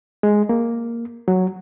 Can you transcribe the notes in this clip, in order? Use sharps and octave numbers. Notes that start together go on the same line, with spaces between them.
G#3
A#3
F#3